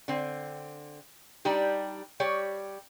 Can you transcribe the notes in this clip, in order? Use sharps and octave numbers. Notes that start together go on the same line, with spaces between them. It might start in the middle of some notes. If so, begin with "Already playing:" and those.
D3 C4
G3 D4 D#4 G4
G3 G4 C#5